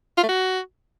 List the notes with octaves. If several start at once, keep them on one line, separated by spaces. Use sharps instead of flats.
F4
A3
F#4